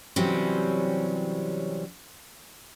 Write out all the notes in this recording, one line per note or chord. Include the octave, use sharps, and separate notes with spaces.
C3 E3 F#3 G3 C4 C#4